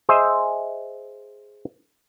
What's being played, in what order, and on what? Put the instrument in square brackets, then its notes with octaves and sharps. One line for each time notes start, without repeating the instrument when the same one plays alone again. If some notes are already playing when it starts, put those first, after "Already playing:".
[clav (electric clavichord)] G#4 C5 D#5 E5